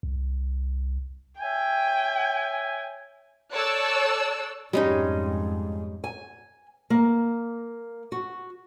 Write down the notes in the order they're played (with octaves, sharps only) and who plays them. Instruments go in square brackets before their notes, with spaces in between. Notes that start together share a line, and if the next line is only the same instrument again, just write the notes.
[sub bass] C2
[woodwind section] C#5 E5 G#5 [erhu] G5
[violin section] A4 C#5 D5 E6 F#6
[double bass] F2 G#2 [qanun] G3 C#4 D#4 [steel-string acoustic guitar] G#3
[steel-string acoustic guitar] G#5
A#3
F#4